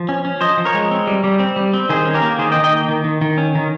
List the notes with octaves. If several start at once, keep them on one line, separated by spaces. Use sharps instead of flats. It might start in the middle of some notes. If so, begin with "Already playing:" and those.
Already playing: F3
C#4
C#4
F3 C5 D#5
F3
A#4 C#5
G#3
C4
G3
G3
C4
G3
C4
D#3 G#4 C5
C#4
G4 A#4
A#3
D#3 G#4 C5
D#5 G5
D#3
D#5 G5
A#3
D#3
D#3
D#3
C#4
D#3